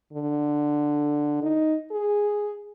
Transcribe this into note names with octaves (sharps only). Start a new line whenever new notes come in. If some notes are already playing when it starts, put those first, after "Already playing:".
D3
D#4
G#4